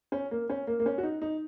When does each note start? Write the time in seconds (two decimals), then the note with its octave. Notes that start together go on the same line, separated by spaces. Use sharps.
0.12 C#4
0.31 A#3
0.50 C#4
0.67 A#3
0.80 A#3
0.86 C#4
0.98 F#4
1.03 D#4
1.22 D#4